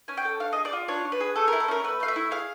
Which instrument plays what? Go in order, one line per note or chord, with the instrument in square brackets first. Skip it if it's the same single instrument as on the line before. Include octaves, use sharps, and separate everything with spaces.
[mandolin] C#4 G#5
G5
A4
D4 F5
D#5
G#4
D5
F4
D4 C#5
D4
B4
G#4
A3 A4
A#4
E4
A4
C#4 A#4
A3 B4
A3 F5
E5
E4
G#4 F5